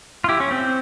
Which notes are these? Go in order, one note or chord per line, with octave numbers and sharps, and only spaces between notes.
F4
E4 G4
C#4
C4